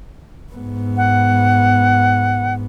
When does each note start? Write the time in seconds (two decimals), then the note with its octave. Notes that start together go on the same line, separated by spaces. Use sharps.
0.53 G#2 B3
0.97 F#5